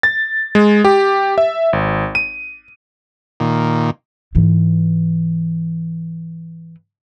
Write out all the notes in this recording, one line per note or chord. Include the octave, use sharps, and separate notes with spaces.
A6
G#3
G4
E5
G#1
D#7
A#2 D#3
G#2 E3